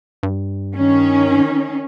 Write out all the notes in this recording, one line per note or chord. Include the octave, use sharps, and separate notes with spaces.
G2
D#3 C#4